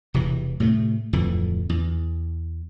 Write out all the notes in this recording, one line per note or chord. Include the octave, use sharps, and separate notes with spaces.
E1 C3 E3
A2 C3 F#3 A3
D1 F2 D3 E3
E2